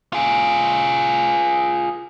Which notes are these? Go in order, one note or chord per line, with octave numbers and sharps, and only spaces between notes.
F4 G#4